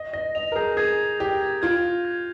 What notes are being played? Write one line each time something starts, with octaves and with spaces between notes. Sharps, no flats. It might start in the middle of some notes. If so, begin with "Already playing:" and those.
Already playing: D#5
D#5 A#6
D#5 F7
A#4
G#4 G6
G#4 G#6
G#6
G4 G#6
G#6
F4 G#6
G#6
G#6